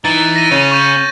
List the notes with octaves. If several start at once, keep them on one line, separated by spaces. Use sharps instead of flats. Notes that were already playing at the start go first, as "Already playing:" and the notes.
E3 D#4 A6
A#6 D#7
C#3 C#4
C#6 G6 D#7